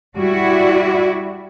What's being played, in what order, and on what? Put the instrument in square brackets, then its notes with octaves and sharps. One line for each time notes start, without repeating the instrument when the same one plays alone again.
[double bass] G3 [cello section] E4 F#4 D5